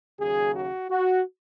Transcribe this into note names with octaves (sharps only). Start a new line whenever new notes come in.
D#2 C#3 F#3 G#4
F#4
F#4